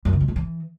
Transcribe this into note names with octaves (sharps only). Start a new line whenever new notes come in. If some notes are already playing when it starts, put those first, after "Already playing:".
F#2
C#3
G#3
G#2
E3